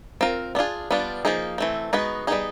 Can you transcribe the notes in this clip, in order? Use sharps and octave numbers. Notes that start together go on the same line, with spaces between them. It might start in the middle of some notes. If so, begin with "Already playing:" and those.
C4 F4 A#4
B3 D4 F4 G#4
G3 B3 D4 F4
F3 A#3 D#4 G#4
E3 A3 C4
G#3 B3 D#4 F#4 B4
G3 B3 D#4 G#4